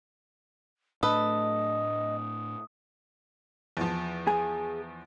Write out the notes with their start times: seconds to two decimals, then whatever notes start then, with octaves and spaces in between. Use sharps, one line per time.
1.03 A2 A3 D4 A4 B4 D#5 D#6
3.77 E2 F3
4.27 G#4